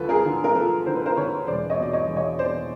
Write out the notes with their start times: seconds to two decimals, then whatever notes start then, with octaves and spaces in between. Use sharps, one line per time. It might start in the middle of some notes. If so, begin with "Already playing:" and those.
Already playing: D2 F3 A4 B4
0.09 G#4 A#4
0.25 D3
0.44 A#4
0.55 F3 A4 B4
0.86 D3 C5
0.96 B4
1.06 A#4 C5
1.17 D3 B4 C#5
1.47 E1 C5 D5
1.70 C#5 D#5
1.78 B2 D5
1.93 C#5 D#5
2.08 E1
2.16 C#5 D#5
2.39 E2 C5 D5